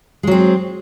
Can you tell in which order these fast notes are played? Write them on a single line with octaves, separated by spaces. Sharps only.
G#3 F#3 C4